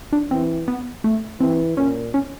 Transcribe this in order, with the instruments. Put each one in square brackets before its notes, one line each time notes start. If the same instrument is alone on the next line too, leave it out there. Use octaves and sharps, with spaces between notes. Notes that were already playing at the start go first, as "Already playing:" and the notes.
[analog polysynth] D4
[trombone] E3 [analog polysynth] C4
[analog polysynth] B3
A3
[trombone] E3 [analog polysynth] C4
[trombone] A#2 [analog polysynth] C#4
[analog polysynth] C#4